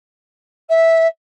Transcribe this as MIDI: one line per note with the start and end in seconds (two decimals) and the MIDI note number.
0.69 1.07 76